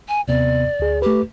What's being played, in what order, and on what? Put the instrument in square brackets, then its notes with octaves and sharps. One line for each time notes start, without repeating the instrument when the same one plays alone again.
[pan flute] G#5
[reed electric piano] D#2 C3 B3 [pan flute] D5
[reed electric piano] D2 G#4
[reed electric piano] A3 B4 [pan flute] G4